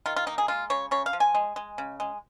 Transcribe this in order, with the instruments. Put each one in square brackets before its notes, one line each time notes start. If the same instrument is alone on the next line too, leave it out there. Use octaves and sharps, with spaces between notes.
[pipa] D#3 F4
F4
A#3 D#4
G#4
G#3 F4
C#3 C#5
C#3 C#5
F5
F3
G#5
G#3
G#3
C#3
G#3